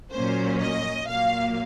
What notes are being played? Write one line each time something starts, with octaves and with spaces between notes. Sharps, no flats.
A#2 F#3 A#3 C#4 C5
D#5
A#2 F#3 A#3 F5